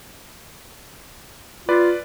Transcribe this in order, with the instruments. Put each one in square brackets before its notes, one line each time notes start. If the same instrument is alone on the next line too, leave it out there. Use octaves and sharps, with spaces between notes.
[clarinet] F4 [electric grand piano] B4 D5